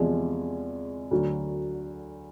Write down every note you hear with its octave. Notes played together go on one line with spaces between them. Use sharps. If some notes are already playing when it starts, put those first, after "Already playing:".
Already playing: E2 C3 F3 G#3
D2 D3 F#3